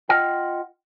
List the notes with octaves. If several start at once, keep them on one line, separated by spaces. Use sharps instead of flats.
F4 D#5 F#5 G5